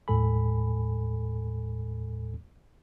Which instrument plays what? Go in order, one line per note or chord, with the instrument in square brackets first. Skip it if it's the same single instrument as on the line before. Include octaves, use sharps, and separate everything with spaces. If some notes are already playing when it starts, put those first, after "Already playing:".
[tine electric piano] D#2 A2 G#3 A4 G#5 B5